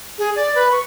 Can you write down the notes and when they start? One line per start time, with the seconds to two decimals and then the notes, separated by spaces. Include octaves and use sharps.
0.18 G#4
0.36 D5
0.55 B4
0.72 C#6